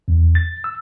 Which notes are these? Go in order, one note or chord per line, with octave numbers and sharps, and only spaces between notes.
E2
A6
E6